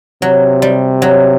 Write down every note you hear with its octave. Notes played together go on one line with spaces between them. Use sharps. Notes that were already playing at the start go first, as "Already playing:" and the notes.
C3 F#3
G3
F#3